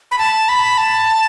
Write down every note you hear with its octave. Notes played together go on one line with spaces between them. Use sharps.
B5
A5
B5
A5